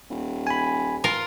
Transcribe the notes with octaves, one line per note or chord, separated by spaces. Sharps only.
D#1
G#5 B5
F4 A#4 F5